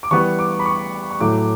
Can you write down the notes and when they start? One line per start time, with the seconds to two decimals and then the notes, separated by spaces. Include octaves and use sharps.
0.03 D6
0.11 E3 G3 B3 C#6
0.39 D6
0.59 B5
0.65 C#6
1.11 C#6
1.20 A2 F#3 A3 D6